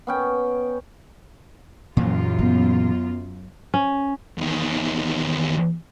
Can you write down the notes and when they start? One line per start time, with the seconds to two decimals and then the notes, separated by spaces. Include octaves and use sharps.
0.07 B3 C#4 G5
1.97 F#2 A#2 E3 A#3 F4
2.39 B3
3.74 C#4
4.38 E2 D#3